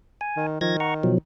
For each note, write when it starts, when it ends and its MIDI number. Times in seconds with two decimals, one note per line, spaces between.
0.21 0.46 80
0.37 0.58 51
0.61 1.15 51
0.61 0.77 53
0.61 0.77 92
0.61 0.77 94
0.80 0.94 78
0.80 0.94 82
0.80 0.94 85
1.03 1.18 47
1.03 1.18 53
1.03 1.18 54